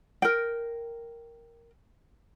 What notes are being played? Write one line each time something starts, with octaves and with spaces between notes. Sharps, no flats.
A#4 G5